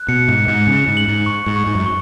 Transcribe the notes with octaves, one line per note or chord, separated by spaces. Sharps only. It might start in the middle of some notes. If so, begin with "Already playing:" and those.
Already playing: F#6
B2 C#7
G#2
C#7
G#2
C#3 C#7
G#2
F#7
G#2
C#6
G#2
C#6
G#2
F#2
C#6